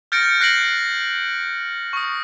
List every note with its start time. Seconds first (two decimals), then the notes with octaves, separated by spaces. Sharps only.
0.12 F6 G6 A6 A#6 C#7 D7
0.41 F#6 A#6 C7 D7 F#7
1.93 C#6 D#6